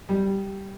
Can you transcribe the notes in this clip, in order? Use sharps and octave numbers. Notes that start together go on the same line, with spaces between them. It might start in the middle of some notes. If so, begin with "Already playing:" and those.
G3